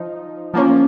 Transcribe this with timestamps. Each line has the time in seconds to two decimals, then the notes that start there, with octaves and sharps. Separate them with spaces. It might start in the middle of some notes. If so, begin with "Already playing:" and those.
Already playing: F3 D#4
0.54 F3 A#3 C#4